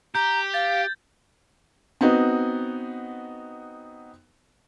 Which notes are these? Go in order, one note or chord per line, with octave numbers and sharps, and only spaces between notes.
G4 A#5 G6
F5 A6
B3 C4 D#4 F#4